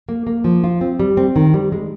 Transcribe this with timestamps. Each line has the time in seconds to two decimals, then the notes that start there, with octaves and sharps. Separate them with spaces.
0.09 A#3
0.27 A#3
0.44 F3
0.64 F4
0.81 C4
1.00 G3
1.17 C4
1.36 D#3
1.54 G3
1.72 G#3